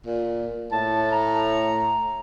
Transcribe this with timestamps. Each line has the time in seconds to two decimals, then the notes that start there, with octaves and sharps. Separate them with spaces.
0.06 A#2
0.72 A2 A5
1.12 A#5